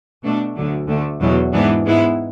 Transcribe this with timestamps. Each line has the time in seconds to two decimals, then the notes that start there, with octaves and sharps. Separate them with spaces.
0.22 B2 A3 D4
0.55 D2 D3 F#3
0.87 D2 D3 A3
1.20 E2 B2 F#3
1.52 G#2 E3 B3 D4
1.85 G#2 G#3 B3 E4